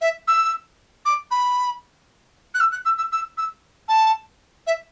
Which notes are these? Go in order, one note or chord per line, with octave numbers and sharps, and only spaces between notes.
E5
E6
D6
B5
F#6
E6
F#6
E6
E6
E6
E6
A5
E5